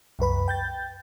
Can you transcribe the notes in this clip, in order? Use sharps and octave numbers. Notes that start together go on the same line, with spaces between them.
C2 F#2 B4 B5
G5 G6 A6